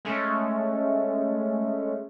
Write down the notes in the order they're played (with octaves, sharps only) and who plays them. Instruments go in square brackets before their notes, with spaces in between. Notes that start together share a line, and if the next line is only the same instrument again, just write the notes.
[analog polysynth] G#3 A3 C#4